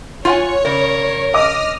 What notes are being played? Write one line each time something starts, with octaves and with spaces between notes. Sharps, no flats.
F4 C#5 F#5 G#5
C#3 A#4 D5
D#5 D6 D#6 F6 A#6